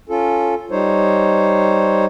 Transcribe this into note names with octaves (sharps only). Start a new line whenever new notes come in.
C#4 F4 A4
G3 D#4 C5 C#5